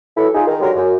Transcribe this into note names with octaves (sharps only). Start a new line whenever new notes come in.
E3 F#3 E4 A4
D#4 F4 G#4
D#3
D3 F#3 G#3 G4 A#4
F#2